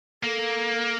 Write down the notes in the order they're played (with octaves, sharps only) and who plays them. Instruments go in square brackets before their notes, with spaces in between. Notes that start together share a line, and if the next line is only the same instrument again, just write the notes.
[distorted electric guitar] A#3 [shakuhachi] A4